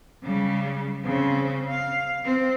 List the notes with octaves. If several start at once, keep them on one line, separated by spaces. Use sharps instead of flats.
C#3 G3
C#3 C4
F5
C4